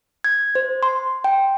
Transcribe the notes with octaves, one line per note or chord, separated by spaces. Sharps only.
G#6
C5
C6
G5